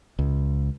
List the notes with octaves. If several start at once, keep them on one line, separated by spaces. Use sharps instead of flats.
C#2